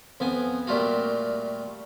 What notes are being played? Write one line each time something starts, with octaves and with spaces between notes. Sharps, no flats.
F2 B3 G#5
A#2 G3 A3 F4 F#4